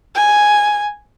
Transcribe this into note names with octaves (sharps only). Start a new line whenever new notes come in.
G#5